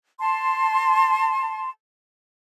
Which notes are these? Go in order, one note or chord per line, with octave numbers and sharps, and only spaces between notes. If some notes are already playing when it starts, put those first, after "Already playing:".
A5 C6